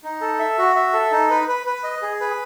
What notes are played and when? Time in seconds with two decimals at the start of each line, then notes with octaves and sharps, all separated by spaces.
0.04 D#4
0.21 A4
0.39 E5
0.58 F#4
0.76 E5
0.93 A4
1.11 D#4
1.30 B4
1.48 B4
1.66 B4
1.84 D#5
2.02 G#4
2.20 B4